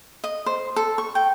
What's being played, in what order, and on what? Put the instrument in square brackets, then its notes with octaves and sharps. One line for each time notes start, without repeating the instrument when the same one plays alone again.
[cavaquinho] D#5
C5
A4
C#6
G5